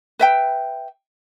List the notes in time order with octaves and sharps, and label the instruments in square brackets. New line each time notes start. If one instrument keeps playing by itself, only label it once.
[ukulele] B4 E5 G5